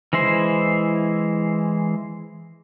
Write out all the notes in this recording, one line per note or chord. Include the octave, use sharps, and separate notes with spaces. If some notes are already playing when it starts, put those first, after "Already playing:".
E3 G#3 E4 C5